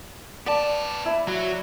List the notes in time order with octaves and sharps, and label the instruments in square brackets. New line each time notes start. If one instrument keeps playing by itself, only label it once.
[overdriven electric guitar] B3 A5 [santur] D5
[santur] E4
[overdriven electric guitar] F#3 F#4